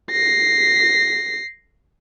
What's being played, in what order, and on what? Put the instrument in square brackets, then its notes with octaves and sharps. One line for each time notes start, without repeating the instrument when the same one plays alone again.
[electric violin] A#6 C7